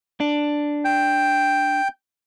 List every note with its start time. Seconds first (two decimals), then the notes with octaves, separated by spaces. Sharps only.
0.20 D4
0.85 G5